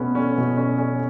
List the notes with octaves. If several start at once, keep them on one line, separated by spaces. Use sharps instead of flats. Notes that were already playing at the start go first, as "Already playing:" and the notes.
Already playing: B2 A3 B3 C#4
C#4
B2 A3
C#4
C#4